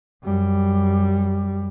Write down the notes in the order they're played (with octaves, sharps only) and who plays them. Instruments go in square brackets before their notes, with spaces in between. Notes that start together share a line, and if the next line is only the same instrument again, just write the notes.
[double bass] F#2 G3